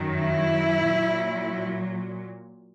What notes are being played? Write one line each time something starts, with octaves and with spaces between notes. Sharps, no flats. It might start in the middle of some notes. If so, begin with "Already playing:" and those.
Already playing: F#2 D#3 F#3
E4
A#2 F#3